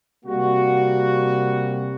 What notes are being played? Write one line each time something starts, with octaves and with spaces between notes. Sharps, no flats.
C3 G3 A#3 F#4